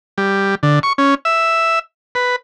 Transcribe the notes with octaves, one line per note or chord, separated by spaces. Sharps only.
G3
D3
C#6
C#4
E5
B4